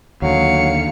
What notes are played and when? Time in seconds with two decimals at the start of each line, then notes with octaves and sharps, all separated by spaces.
0.22 D#2 D3 F#3 F5 C#7